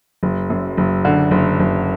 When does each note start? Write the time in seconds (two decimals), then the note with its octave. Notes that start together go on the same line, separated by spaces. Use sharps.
0.23 F#1
0.50 F#2
0.78 F#1
1.05 D3
1.31 F#1
1.60 F#1